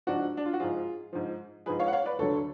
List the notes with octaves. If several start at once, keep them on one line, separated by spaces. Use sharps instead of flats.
G#2 F3 D4 F#4
D4
F4
F#4
G#2 F3 F4 G#4
G#2 F3
G#2 F3 G#4 B4
C#5 F5
F#5
C#5 F5
B4 D5
D2 D3 F#3 A4 C#5